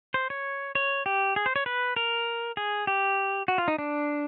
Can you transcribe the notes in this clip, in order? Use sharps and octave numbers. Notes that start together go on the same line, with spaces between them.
C5
C#5
C#5
G4
G#4
C5
C#5
B4
A#4
G#4
G4
F#4
F4
D#4
D4